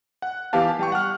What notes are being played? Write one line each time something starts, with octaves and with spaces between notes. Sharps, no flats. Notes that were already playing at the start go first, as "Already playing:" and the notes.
F#5
E3 B3 G4 F5 A5
G3 G5 C#6
F#5 F6